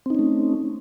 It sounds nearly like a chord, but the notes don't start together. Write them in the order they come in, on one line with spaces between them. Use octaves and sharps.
C4 D#4 C#4 A3